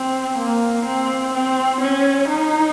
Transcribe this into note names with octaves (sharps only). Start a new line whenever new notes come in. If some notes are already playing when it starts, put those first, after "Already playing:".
Already playing: C4
A#3
C4
C4
C#4
D#4